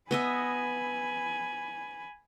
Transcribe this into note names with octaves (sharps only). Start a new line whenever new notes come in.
B3 D#5 E5 G#5 B5